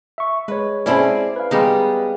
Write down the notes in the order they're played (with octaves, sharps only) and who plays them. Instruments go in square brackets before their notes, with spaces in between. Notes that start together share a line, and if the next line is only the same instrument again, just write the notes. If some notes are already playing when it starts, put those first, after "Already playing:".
[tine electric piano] E5 C#6
[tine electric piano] G#3 C#5 [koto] B4
[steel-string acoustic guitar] C4 G#4 D5 [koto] C#4 E4 A4
[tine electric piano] B4 F5
[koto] G3 G#3 D#4 [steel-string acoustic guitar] B3